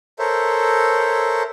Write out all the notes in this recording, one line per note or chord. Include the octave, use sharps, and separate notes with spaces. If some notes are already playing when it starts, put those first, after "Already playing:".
A4 A#4 C5 C#5 E5